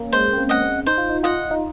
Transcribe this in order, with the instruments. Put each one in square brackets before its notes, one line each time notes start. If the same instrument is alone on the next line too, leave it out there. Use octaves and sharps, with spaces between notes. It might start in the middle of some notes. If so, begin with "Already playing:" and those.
Already playing: [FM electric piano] A#3 C#4
[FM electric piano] G#3 [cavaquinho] C5
[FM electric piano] C4
A#3
[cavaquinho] D#5 F#5
[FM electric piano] C4
[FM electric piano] D#4 [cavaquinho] C5
[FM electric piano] F4
D#4
[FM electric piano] F4 [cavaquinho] D#5 F#5
[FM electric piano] D#4